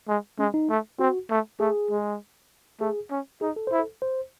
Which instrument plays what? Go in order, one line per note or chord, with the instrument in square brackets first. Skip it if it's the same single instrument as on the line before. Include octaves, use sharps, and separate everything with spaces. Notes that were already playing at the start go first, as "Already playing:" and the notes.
[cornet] G#3
[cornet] G#3 [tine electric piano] C#4
[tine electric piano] D#4
[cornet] A3
[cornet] C4 [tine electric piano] F#4
[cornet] A3
[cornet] A3 [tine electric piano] G#4
[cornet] G#3
[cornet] A3 [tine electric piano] G#4
[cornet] C#4
[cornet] D#4 [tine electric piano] G#4
[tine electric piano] A4
[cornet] E4 [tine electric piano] C5
[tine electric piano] A4
C5